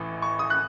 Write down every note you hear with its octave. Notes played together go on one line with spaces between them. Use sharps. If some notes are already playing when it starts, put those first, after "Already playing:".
Already playing: A1 A2 E3
C#6
D#6
F#6